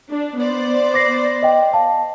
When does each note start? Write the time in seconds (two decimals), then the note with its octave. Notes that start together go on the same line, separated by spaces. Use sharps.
0.11 D4
0.40 B3 C5 D5
0.94 D6 A#6 C7
1.43 D#5 G5
1.73 F5 A5